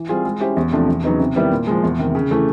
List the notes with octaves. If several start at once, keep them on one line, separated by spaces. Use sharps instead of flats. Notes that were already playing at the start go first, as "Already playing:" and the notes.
Already playing: E3
G3 C4 F4 G#4
G#3
C#4 E4 G4 C5
E2
C3 F3 A3 D4
E2
C#3 F#3 B3 D#4
C3
D#3 G3 B3 E4
A#2
F3 G#3
E2
C3 D#3
C#3
E3 A3